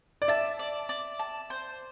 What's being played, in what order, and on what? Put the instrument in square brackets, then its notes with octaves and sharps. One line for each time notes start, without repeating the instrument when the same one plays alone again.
[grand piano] D5
[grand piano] E5 [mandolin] A5
[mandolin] D5
D5
A5
C5